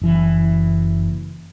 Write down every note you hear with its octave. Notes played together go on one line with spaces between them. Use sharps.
F#1 E3